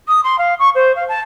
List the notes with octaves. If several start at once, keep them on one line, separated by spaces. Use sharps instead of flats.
D#6
C6
F5
C#6
C5
F5
A5